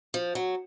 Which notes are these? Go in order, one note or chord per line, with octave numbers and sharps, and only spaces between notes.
F3
F#3